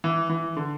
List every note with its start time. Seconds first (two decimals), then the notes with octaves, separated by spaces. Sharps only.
0.04 E3
0.30 E3
0.57 D3